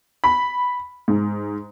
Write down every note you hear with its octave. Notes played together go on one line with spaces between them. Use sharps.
B5
G#2